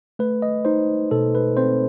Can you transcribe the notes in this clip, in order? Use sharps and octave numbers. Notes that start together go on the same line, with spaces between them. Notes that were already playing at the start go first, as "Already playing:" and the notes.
A3 B4
D#5
D#4 C5
B2 A4
B4
C4 C5